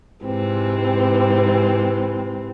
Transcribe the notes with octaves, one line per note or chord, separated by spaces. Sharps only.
G#2 C3 E3 C4